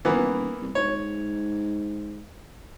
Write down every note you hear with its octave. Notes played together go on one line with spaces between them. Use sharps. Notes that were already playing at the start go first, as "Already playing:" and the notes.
D#1 E3 A#3 B3
C2
G#2 C#5